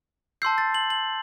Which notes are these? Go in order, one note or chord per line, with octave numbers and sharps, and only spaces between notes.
A5 C6 E6 G6 C7
A6
F#7
F#7